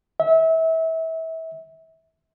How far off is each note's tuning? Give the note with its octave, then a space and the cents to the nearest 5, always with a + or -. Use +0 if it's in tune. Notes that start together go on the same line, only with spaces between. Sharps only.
E5 -30